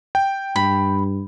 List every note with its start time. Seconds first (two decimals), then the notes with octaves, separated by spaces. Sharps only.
0.15 G5
0.56 G2 B5